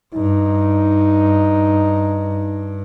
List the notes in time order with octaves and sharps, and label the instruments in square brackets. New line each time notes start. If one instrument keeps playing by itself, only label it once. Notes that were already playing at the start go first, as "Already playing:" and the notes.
[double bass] G2 [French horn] D#4